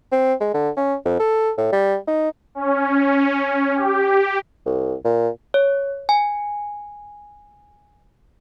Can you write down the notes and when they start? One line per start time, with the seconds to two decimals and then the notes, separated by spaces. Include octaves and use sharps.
0.12 C4
0.41 G#3
0.54 D3
0.77 C#4
1.05 F2
1.20 A4
1.58 A2
1.72 G3
2.07 D#4
2.55 C#4
3.76 G4
4.66 C2
5.05 A#2
5.54 C#5
6.09 G#5